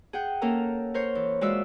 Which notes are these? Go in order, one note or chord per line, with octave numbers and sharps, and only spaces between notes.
G#4 F#5 G5
A#3 C#4 A4 A#4 A#5
A#4 C5 C#5
E3
G#3 F4 F#4 D5 E5 E6